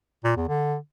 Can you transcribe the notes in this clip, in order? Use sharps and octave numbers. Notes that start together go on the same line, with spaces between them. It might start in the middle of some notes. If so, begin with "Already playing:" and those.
A#2
E2
D3